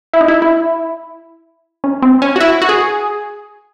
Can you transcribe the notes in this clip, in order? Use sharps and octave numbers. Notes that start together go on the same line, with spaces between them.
E4
D#4
E4
E4
C#4
C4
C#4
F#4
E4
F#4
G#4